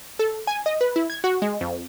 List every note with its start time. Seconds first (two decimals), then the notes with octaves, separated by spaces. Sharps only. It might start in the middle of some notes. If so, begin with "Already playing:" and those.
0.19 A4
0.47 G#5
0.66 D#5
0.81 B4
0.96 E4
1.10 G#6
1.24 F#4
1.42 G#3
1.61 F2